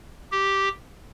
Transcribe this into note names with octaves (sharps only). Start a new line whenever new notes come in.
G4